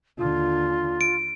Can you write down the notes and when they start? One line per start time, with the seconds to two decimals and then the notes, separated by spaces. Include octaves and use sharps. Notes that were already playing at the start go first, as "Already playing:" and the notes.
0.18 D#2 D3 F4
1.01 D7